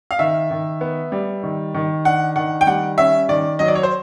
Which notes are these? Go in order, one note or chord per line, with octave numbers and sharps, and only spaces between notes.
F5
D#3 E5
D#3
B3
G3
D#3
D#3
D4 F#5
D#3 F#5
G5
G3 F#5
C#4 E5
D#3 D5
F#3 D#5
D5
C#5
C5